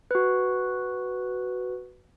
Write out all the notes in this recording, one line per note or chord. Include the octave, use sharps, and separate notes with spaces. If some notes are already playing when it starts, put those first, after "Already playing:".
F#4 B4